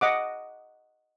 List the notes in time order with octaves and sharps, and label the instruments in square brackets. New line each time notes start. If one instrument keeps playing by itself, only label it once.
[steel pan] D#5 F#5 D6